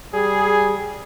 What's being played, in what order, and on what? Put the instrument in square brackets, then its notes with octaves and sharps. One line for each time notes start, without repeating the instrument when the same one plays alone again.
[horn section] G3 G#4